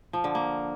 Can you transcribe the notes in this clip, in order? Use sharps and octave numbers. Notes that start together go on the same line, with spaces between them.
F3
D3
A#3